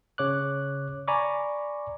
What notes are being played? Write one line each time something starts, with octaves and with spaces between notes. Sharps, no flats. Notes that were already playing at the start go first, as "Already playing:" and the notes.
C#3 C#5 D6 F#6
D5 G#5 A#5 B5 C#6 D6